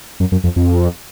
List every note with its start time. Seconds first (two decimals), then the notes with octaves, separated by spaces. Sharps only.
0.20 F#2
0.32 F#2
0.44 F2
0.56 F2